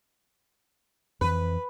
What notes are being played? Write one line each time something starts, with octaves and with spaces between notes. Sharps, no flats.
F2 E3 B4